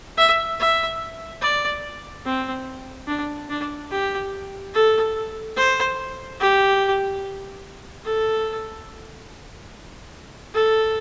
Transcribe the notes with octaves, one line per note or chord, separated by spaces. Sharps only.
E5
E5
D5
C4
D4
D4
G4
A4
C5
G4
A4
A4